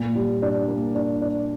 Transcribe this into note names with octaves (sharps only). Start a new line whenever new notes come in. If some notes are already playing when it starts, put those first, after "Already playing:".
Already playing: A#2
G3
D4
A#3
D4
D4